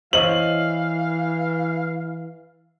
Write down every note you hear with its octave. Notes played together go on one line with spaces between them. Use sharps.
E3 C5 C#5 D#5 F5 F#7